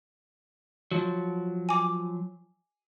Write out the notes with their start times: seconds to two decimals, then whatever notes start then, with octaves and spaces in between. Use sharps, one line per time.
0.91 F3 F#3
1.69 G#5 D6